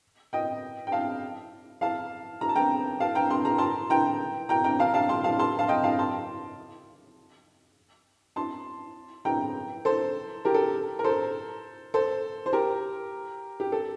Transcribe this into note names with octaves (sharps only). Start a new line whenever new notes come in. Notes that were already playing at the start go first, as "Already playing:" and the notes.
D#5 G5
G5
F5 A5
F5 A5
A#5
A5
G5 A#5
F5 A5
G5 A#5
C6
A#5
A5 C6
G5 A#5
G5 A#5
G5 A#5
F5 A5
F5 A5
A5 C6
F5 A5
A5 C6
F5 A5
D#5 G5
F5 A5
A5 C6
A5 C6
G5 A#5
A4 C5
G4 A#4
A4
A#4
A4 C5
A4 C5
C5
G4 A#4
G4
A4